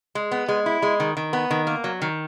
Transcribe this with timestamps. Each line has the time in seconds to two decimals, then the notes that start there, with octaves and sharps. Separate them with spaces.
0.15 G#3
0.31 B3
0.48 G#3
0.66 E4
0.82 G#3
1.00 D#3
1.17 D#3
1.33 B3
1.51 D#3
1.67 A#3
1.84 F#3
2.02 D#3